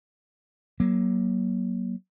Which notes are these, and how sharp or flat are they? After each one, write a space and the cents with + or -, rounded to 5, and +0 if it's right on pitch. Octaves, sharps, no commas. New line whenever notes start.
F#3 +20 A#3 +25